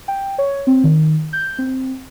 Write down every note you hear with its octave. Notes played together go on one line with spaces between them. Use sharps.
G5
C#5
C4
D#3
G6
C4